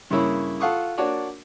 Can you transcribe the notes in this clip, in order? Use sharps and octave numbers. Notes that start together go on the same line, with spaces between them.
G2 C#3 A#3 E4 C#5 B5
F4 A4 F5 F#5 C#6 D#6
A#3 D4 F#4 C#5 D5